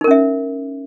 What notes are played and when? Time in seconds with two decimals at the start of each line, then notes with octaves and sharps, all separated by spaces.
0.01 D#4
0.04 A#4
0.08 C#4
0.11 E5